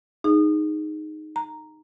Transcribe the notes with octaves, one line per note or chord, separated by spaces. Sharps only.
D#4 G#4
A#5